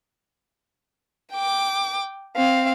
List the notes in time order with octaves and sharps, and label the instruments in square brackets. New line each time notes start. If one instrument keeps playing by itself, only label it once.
[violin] G5 D6
C4 F5